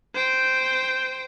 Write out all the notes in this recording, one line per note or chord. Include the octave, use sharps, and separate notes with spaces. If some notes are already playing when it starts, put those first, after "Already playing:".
C5 G5